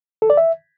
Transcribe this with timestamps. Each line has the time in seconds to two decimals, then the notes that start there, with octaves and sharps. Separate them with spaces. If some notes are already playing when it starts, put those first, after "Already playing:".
0.22 A4
0.30 D5
0.37 E5